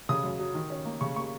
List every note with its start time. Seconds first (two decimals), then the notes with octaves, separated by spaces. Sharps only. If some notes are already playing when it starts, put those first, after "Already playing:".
0.09 C#3 D#6
0.24 F#2
0.39 F#3
0.55 D#3
0.70 C#4
0.85 A#3
1.01 C#3 C#6
1.16 A#3 C#6